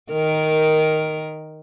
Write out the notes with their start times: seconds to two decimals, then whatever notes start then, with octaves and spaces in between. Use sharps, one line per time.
0.12 D#3 A#4